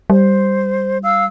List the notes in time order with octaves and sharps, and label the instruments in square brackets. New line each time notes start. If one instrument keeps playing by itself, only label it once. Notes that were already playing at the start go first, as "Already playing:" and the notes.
[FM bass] G3 [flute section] C5
[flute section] F5 E6